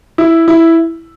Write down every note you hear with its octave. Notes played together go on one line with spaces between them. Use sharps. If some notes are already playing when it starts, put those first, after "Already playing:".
E4
E4